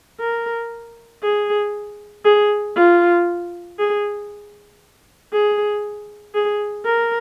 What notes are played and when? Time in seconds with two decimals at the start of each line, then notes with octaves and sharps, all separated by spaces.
0.20 A#4
1.23 G#4
2.25 G#4
2.76 F4
3.79 G#4
5.33 G#4
6.35 G#4
6.85 A#4